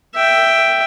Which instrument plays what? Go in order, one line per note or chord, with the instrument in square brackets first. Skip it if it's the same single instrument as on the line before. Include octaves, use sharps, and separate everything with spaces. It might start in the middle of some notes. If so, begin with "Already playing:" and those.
[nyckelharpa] E5 G5